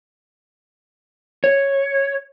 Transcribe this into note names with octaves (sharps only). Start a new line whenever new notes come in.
C#5